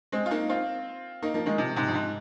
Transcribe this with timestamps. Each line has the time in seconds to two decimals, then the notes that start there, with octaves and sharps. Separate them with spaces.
0.12 G#3 C4
0.26 F4
0.31 A#3 D#4
0.49 C4 F4
1.22 A#3 D#4
1.34 F3 A#3
1.46 D#3 G#3
1.58 C3 F3
1.76 G#2 C3
1.88 F2
1.95 G#2